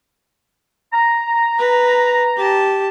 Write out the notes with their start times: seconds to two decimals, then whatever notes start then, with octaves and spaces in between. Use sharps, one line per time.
0.93 A#5
1.58 B4
2.36 G4 A5